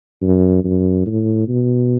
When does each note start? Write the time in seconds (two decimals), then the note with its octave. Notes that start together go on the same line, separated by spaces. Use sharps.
0.22 F#2
0.64 F#2
1.06 A2
1.48 B2